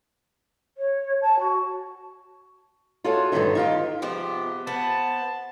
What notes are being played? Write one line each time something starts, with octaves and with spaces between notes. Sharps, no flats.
C#5
A5
F#4
F4 F#4 G#4 A4 C#5 D5
G2 D3 D#3 B3 D#4
D#4 F4 G4
C3 F3 G#3 B3 G4
B3 C5 A5